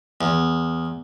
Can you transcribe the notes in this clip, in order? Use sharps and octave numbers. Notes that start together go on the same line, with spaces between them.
E2